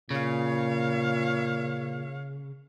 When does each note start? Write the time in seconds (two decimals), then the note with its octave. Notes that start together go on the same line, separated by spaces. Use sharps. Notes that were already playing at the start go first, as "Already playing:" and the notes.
0.10 A#2 C#3 C#5 F5